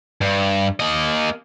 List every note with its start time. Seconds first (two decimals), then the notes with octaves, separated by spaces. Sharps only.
0.21 G2
0.80 A#3 D#5